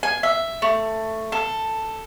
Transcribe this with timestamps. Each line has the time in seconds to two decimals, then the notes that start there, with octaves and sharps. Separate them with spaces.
0.03 G#5
0.23 E5
0.62 A3
1.32 A4